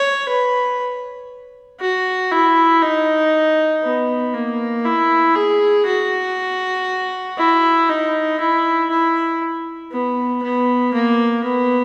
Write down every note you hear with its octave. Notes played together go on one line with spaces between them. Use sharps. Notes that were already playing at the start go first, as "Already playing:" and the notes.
Already playing: C#5
B4
F#4
E4
D#4
B3
A#3
E4
G#4
F#4
E4
D#4
E4
E4
B3
B3
A#3
B3